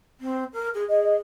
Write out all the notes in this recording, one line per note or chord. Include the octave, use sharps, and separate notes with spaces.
C4
A#4
G#4
G#4 D#5
D#5